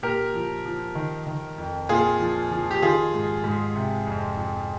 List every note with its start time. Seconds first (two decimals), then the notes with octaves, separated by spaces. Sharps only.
0.03 A#2 G4 A#4
0.34 F3
0.65 F3
0.95 D#3
1.27 D#3
1.58 F2
1.89 A#2 F4 G#4
2.20 F3
2.51 F3
2.71 G4
2.82 D#3 F4 G#4
3.14 G#2
3.44 G#2
3.75 C3
4.07 F2
4.37 F2